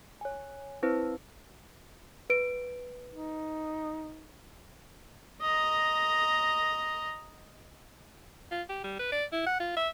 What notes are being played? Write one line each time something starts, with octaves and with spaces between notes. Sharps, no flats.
C#5 G#5
C4 E4 B4 C5
B4 D7
D#4
D#5 A#5
F4
G4
G3
B4
D5
E4
F#5
F4
E5